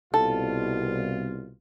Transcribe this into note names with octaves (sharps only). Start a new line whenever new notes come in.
C2 B2 F4 A4